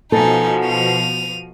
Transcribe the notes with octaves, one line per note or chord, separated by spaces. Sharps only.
B2 F3 D#4 A4 G#5
D#7 F7